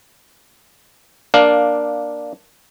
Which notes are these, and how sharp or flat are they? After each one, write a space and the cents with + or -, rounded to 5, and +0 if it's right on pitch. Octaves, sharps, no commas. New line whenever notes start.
A#3 +0 D4 +0 F5 +10